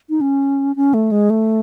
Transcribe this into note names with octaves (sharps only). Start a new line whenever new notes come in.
D#4
C#4
C#4
A3
G#3
A3